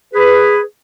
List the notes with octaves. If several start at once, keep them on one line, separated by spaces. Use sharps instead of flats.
G#4 B4